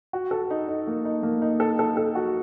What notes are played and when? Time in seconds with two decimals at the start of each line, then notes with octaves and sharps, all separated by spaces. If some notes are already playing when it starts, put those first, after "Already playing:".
0.13 F#4
0.31 A4
0.50 D#4
0.68 D#4
0.87 A#3
1.05 D#4
1.23 A#3
1.42 D#4
1.60 A4
1.79 A4
1.97 A4
2.15 F#4